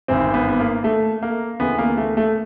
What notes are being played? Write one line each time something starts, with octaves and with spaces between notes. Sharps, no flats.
G#1 G2 E3 C4
B3
B3
A#3
A3
A#3
D2 C#3 E3 B3
A#3
A3
A3